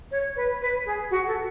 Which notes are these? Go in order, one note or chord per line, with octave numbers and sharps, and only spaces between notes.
C#5
B4
B4
G#4
F#4
A4